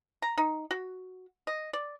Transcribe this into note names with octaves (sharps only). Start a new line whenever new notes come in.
A#5
D#4
F#4
D#5
D5